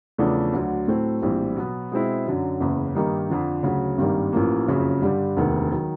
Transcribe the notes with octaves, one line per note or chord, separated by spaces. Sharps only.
E2 C#3 F3 A3 D4
D2 D3 F#3
A2 F#3 A3 C4
A#1 A2 E3 G3 C4
B2 F#3 B3
B2 G#3 C4 E4
F#2 D3 F#3
F#1 E2 C#3
G2 D#3 G3 A#3 D#4
F2 D3 F3
D2 C#3 F#3
G#1 G2 D#3 G3 A#3
A1 A2 F3 A#3
F#1 F2 C#3 F#3
G2 D3 G3
E1 D2 C3 D#3
D#3 F#3